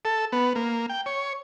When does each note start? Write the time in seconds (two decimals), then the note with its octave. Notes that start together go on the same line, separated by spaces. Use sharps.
0.05 A4
0.32 B3
0.55 A#3
0.89 G5
1.06 C#5